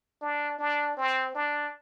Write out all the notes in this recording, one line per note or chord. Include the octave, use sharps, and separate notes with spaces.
D4
D4
C4
D4